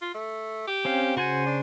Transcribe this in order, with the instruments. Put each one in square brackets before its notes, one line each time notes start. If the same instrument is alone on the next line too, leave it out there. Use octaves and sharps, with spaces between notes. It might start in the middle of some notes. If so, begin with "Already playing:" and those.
[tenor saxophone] F4
A3
G4
[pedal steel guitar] C4 C#4 F5
[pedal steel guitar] C#3 C5 G#5 [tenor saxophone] F#4
[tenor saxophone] D4